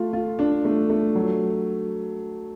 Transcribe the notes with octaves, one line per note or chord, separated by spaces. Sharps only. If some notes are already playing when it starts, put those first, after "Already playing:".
Already playing: A3 F4
F4
D4
A3
A3
F#3